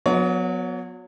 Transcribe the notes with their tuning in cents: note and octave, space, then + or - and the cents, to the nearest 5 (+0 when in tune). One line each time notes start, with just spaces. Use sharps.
F#3 -30 B3 +0 C#5 +35